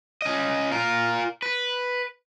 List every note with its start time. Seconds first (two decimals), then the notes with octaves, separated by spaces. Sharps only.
0.22 C#4 D#5
0.72 F4 A#4
1.42 B4